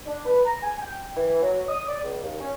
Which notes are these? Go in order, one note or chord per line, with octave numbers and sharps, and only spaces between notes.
D4
B4
A#5
G#5
G5
E3
F#3
D#6
D5
C#2
D#2
C#4